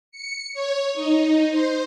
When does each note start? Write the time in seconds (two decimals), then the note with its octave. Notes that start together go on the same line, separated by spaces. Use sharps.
0.11 C#7
0.53 C#5
0.94 D#4
1.51 C5